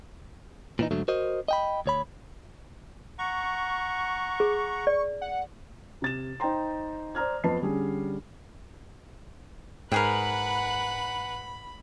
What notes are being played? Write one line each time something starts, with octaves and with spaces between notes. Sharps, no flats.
A#2 E3 D#4
G#2 D3 F#3 A3
F#4 A#4 C5 D#5
D#5 G5 B5
D2 C#5 B5
F#5 A#5 C#6
G#4
D5
F#5
C3 A6 E7
D#4 C5 G5 A#5 C6
C5 D5 A#5 F6 G#6
F2 B3 D#5 A5 C7
D3 G3 C#4 D4 G#4
G#2 G4 G#4 A#4 B4 F#5 B5